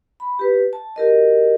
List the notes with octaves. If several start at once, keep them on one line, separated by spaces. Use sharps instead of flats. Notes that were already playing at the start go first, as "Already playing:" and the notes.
B5
G4 B4
A5
F#4 G4 A#4 D#5